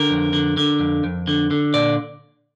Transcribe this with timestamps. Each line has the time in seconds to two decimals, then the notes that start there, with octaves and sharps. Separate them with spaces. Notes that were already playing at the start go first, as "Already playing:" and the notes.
Already playing: D3 A#4
0.10 F2
0.33 D3
0.57 D3
0.80 F2
1.04 F2
1.27 D3
1.51 D3
1.74 A#2 D5